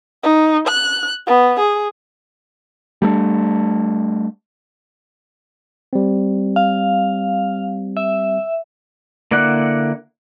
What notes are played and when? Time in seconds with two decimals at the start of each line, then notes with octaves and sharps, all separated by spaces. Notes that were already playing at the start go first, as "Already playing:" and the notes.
0.23 D#4
0.67 F#6
1.27 B3
1.59 G#4
3.02 G3 A3 A#3 D4
5.93 G3 C4
6.56 F5
7.97 E5
9.31 D3 A#3 E4 D5 F#5